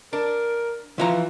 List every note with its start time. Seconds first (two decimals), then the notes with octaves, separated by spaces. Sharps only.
0.13 D4 A#4
0.98 E3 F3 F4 A#5